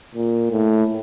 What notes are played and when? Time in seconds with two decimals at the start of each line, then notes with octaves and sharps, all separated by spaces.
0.15 A#2
0.51 A2